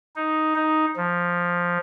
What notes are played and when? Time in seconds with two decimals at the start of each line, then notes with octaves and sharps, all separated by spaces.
0.16 D#4
0.55 D#4
0.97 F3